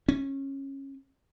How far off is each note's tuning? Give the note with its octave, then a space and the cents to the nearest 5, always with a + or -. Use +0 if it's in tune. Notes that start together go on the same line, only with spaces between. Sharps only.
C#4 -20